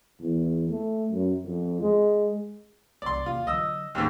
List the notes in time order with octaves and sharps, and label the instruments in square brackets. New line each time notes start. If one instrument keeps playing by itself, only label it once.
[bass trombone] E2
A3
F#2
F2
G#3
[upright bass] F#1 C2 [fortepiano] D5 C6
[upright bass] D#2 [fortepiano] F4
[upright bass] D3 F#3 [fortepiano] D#5 E6
[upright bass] D1 G#1 [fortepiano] D#2 G#2